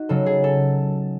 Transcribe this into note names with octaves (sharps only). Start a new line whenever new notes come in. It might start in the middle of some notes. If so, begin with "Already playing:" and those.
Already playing: D#4 F#4
C#3 F#3 A4
G#4
A4